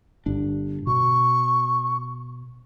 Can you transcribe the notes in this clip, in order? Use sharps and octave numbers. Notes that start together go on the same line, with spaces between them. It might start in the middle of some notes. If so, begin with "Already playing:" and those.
G1 D4
B2 C#6